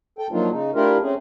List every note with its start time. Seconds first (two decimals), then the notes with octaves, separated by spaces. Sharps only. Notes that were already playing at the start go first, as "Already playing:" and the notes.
0.19 A4 G5
0.32 F3 F#3 A#3 D4 D#4 F4
0.50 C#3 D#4
0.75 A3 D4 E4 F4 G4 A#4
1.03 A3 C4 C#4 G#4